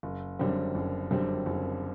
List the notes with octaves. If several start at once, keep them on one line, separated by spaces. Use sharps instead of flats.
F#1
F#2 D3 G3 C4
F#1
F#2 D3 G3 C4
F#1